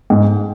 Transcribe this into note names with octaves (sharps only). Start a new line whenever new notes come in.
G#2